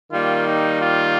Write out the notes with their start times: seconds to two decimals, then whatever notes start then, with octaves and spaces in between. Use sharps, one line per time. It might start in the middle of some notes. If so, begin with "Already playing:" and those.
0.12 D#3 G3 A#3 F4
0.47 D#4
0.82 F4